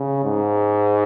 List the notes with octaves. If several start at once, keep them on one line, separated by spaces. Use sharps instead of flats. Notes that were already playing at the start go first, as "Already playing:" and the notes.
Already playing: C#3
G#2